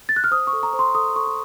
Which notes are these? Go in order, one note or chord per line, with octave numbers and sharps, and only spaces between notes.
A6
F#6
F6
C5 D#6
C#6
A4
A#5
C5
C6
A4 D#6
A4 C#6
C6